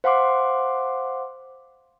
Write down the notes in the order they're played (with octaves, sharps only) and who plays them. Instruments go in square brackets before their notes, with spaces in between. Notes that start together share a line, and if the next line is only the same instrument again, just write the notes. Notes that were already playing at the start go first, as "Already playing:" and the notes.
[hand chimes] C5 F5 F#5 C6 D6